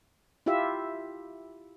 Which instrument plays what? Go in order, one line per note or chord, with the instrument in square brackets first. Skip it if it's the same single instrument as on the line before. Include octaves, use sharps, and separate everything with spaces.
[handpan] E4 F4 G4 E5